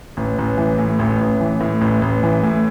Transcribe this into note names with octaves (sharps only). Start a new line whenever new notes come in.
A1
A1
E3
A2
A1
A1
E3
A2
A1
A1
E3
A2